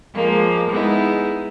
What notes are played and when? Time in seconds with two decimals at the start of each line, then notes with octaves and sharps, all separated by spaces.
0.14 F3 G#3 A#3
0.69 G#3 B3 D#4 E4